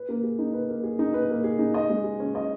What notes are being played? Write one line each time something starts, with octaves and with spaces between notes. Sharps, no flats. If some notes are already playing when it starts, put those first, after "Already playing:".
Already playing: B4
A#3
G#4
D#4
B4
A#3
G#4
D#4
B4
A#3
G#4
D#4
D#5
G#3
G#4
C#4
D#5